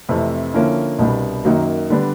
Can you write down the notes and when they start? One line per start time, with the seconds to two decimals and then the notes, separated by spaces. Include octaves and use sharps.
0.09 F2 C3 E3 A3
0.54 D3 F3 A#3 C#4 E4
0.99 C2 B2 G3 B3 D4
1.45 F#2 D#3 F#3 A#3
1.90 D3 G3 B3 D4